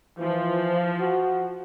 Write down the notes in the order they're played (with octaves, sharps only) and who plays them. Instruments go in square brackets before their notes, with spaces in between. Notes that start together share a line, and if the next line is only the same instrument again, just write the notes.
[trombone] E3 [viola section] F3
[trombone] F#4